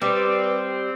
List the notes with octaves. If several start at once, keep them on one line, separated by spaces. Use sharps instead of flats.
G3 C4 B4